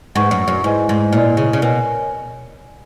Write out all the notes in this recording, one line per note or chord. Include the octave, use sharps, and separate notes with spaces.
G#2 B4 F#5 C#6
F#2
F#2
G#2 E4 B4 D#5 G#5
G#2
A#2 E4 B4 D#5 G#5
C#3
C#3
B2 A#4 C#5 G#5